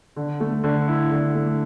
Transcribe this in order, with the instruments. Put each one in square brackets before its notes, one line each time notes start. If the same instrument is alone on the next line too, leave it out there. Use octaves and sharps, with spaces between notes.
[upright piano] D3
A3
D3
E4
D3
A3